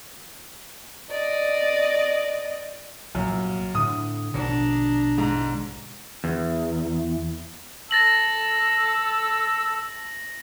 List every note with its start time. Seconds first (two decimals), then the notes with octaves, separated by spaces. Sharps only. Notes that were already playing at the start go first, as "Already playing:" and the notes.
1.10 D5 D#5
3.15 C2 F#2 A#2
3.75 A2 D3 D#6
4.34 A#1 B2 D3 D4 A#5
5.18 G#2
6.24 E2
7.91 A5 E6 A6 A#6 F#7